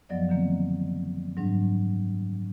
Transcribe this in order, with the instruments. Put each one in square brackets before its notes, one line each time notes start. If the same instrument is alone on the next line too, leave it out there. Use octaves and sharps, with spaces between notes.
[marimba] F#2 F3 F#3 B3 D5 D#5
D3 D#3 A#3 C4
G#2 F#3 G3 D4